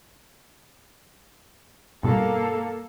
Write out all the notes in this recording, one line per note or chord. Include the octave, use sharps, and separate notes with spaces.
G2 B2 A#3 A4